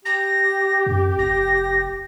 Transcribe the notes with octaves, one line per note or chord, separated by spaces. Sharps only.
G4 A#6
F#2
F1 A#6